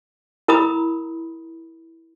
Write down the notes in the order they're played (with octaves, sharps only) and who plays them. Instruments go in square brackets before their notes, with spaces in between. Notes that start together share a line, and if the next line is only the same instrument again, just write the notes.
[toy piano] E4 A#4 A#5 B5 D#6